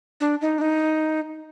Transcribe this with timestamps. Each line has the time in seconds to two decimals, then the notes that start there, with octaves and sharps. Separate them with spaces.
0.20 D4
0.42 D#4
0.58 D4
0.61 D#4